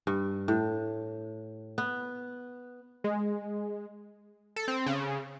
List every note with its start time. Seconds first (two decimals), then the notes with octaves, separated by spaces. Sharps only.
0.07 G2
0.48 A2
1.78 B3
3.04 G#3
4.56 A4
4.68 C4
4.86 C#3